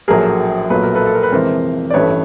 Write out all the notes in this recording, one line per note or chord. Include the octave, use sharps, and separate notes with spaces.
A#1 A2 F#3 A3 G#4 A#4
B1 A#2 F#3 A3 B4
A#4
A4 B4
A4
A#4
B4
F2 C3 E3 G#3 A#4 C5
D5
A1 G2 E3 A3 B4 C#5